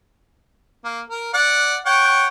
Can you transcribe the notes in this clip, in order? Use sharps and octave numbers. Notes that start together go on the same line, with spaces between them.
A#3
A#4
D5 F#5
C#5 F#5 G5